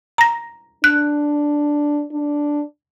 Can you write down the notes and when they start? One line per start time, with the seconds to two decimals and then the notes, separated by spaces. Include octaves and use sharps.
0.18 A#5 A#6
0.84 D4 F#6
2.12 D4